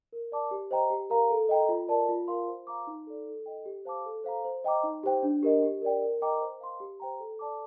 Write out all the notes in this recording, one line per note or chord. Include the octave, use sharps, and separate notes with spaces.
A#4
D5 A5 D6
G4
C5 D#5 G5 A#5
G4
A#4 F5 A#5
A4
D#5 G5 A#5
F4
A#4 D5 A5
F4
A#4 F5 C6
C5
F5 A#5 D6
D#4
A4 D5
A4
D#5 G5
G4
C5 F5 A5 D6
A4
C5 F5 A#5
C5
D#5 G5 A#5 D6
D#4
G4 C5 G5
D4
G4 A#4 D#5
G4
A#4 D5 G5
A#4
D#5 G5 A#5 D6
C5
F5 C6
G4
C5 G5 A#5
A4
D5 A5 D6